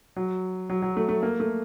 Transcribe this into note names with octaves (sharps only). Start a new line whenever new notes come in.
F#3
F#3
F#3
A3
A3
A#3
A3